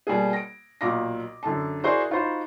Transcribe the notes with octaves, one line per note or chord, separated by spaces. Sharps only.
B2 G3 A#3 G#4
A#6 D7
B1 A#2 F5 D6 A#6
F#2 D3 A4 A5
E4 F#4 G#4 A#4 C5 D5
D#4 F4 F#4 C5 B5